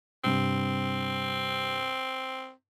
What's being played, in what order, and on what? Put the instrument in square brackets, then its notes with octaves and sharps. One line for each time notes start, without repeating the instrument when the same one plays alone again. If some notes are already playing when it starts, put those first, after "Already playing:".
[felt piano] G2 C3 [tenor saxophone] C4